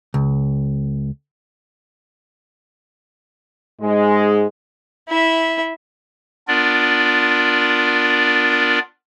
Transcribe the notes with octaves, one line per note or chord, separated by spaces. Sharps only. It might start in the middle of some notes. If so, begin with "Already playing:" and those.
C#2
G#2 G#3
E4 E5
B3 D4 F4 A#4 D5